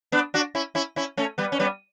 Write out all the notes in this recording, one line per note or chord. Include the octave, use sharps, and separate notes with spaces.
B3 D4
D4 F#4
C#4 E4
C#4 E4
C#4 E4
A3 C#4
G3 B3
C#4
G3 B3